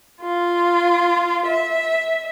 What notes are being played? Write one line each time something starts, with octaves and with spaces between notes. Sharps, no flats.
F4
E5